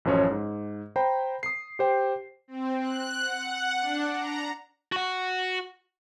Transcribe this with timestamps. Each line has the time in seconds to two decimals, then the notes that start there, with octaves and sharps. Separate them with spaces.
0.05 A1 F#2 F3 C#4 C#5
0.30 G#2
0.96 C5 G5 A#5 B5
1.43 D#6 C7
1.79 G4 C5 G5
2.48 C4
2.81 F#6
3.19 F#5
3.80 D4
4.14 A#5
4.92 F#4 F#5